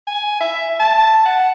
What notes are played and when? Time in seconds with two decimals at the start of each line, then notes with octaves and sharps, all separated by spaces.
0.07 G#5
0.41 E5
0.80 A5
1.25 F#5